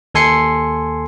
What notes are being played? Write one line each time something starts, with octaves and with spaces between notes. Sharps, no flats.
D#2 A4 G#5 C6 C7 C#7